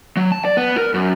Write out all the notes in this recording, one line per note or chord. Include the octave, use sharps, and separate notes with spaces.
F#3
A5
D5
B3
A#4
F#2